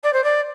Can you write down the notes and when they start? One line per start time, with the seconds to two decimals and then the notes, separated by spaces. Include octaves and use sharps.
0.03 D5
0.13 C5
0.24 D5